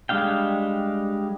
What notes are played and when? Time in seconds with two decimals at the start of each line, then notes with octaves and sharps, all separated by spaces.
0.09 G3 G#3 D4 F5 G5